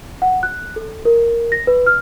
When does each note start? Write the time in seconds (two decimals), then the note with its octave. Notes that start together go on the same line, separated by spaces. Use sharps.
0.22 F#5
0.43 F#6
0.76 A4
1.05 A#4
1.52 A#6
1.67 B4
1.86 F6